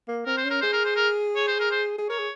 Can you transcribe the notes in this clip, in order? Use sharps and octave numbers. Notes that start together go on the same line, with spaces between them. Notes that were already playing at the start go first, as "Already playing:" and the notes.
A#3
C4 A#4
C5
C#4
A#4
G#4 C5
A#4
C5
A#4
C#5
C5
A#4
C5
G#4
A#4 C#5
G#4